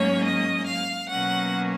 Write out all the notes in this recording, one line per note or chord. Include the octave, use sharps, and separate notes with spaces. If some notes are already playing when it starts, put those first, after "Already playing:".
Already playing: G#2 F#3 A#3 C#4 C#5
D#5
F5
B2 F#3 A#3 C#4 F#5